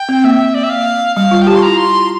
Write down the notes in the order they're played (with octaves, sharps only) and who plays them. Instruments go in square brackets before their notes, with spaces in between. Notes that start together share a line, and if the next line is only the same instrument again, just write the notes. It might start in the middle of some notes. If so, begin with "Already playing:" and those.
Already playing: [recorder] G5
[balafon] C4
[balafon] A#3 [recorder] E5
[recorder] D5
E5
F5
[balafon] G3 [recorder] F5
[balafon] F4
[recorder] G5
[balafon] G4 [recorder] A5
[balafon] F4 [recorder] C6
[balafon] E4 [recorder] A#5
[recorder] C6